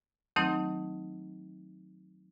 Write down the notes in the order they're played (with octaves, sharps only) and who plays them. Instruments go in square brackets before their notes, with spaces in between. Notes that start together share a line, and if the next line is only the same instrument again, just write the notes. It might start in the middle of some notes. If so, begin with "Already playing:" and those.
[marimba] D#3 F#3 A3 C4 D#4